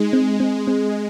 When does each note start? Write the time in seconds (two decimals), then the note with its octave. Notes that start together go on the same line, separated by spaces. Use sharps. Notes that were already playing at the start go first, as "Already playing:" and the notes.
Already playing: G#3 D#4
0.13 C4
0.40 C4
0.67 C4